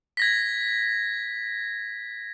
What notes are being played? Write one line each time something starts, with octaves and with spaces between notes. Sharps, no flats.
G#6 A#6 B6